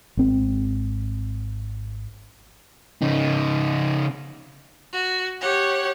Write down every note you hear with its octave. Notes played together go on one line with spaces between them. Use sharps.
G#1 C4
C#3 D#4
F#4
G4 C#5 F#5